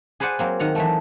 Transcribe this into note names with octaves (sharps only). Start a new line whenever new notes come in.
G#4 B4 C5 D5 F#5 G#5
F#3 A#3 C4
D#3 F#5 A#5
E3 F#3 A3